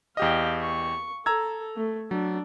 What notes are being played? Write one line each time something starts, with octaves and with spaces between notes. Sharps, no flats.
E2 G4 D#5 F5 G5
C#6
A4 A#5 E6 G#6
A3
F#3 D4